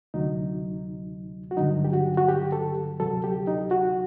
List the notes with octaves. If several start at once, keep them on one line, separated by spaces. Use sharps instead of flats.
D2 C3 F#3 D#4
F#4
G2 D3 F#3 D#4
G4
F#4
F#4
G4
A4
D2 C3 F#3 A4
G4
D#4
F#4